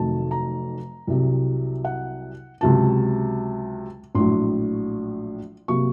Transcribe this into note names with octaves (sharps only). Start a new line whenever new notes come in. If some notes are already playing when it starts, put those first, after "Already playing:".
Already playing: F1 F2 D#3 F#3 A3 A5
A#5
C2 C3 F#3
F#5
C#2 C3 F#3 A5
A#1 A2 F#3 C6
C3 F#3 A#3 C#6